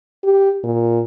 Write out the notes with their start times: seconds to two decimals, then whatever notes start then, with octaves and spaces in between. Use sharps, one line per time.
0.24 G4
0.64 A#2